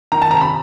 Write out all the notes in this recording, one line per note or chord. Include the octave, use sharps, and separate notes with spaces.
D#3 A#5
A5
C3 A#5
B5